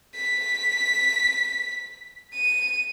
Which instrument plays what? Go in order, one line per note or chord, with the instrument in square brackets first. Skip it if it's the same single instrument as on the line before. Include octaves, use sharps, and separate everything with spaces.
[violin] B6
D#7